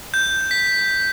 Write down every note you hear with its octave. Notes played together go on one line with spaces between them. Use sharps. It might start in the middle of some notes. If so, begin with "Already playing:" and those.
G6
B6